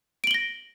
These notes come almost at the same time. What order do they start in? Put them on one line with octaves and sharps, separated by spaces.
D7 F#7 G7 A#6